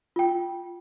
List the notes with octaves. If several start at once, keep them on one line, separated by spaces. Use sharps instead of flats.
F4 G5